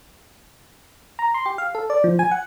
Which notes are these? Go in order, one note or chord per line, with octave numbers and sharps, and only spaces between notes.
A#5
C6
G4
F5
A4
D5
F3
G#5
F#5